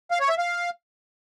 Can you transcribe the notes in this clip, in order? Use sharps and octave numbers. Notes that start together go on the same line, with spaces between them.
F5
C#5
E5
F5